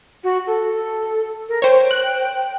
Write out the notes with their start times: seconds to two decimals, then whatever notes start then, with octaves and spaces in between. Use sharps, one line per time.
0.23 F#4
0.46 A4
1.48 A#4
1.62 C5 C#5 G5
1.91 F#6